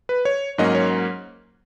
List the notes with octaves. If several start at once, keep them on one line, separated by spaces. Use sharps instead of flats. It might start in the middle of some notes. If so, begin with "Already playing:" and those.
B4
C#5
G#2 F#3 A#3 C#4 D#5
C#5